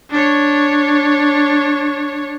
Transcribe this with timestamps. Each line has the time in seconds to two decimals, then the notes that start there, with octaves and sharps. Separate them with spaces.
0.10 D4 C#5